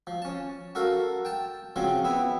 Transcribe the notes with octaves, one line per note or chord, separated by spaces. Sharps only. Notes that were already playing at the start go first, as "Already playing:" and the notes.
F3
C#4 A5
F#4 A4 A#4 F5
G5 A5
C#3 F3 F#3 C4 F4
B3 C4 E4